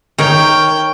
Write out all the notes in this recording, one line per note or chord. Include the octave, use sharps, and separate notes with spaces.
D#3 A#4 C#5 G5